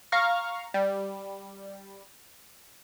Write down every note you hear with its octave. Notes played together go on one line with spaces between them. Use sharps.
F5 A#5 C#6 F6
G3